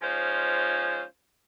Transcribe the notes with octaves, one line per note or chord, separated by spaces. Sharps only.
F3 G#3 C#4 D#4 F4 C5